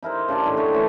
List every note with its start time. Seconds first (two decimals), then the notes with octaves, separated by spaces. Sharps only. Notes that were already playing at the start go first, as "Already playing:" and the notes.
0.03 D#4 E4 A#4 C5
0.28 C#3 D4 C6
0.45 A2 D#3 A3
0.57 C#5 D#5 G5 C6
0.73 D3 E3 C#5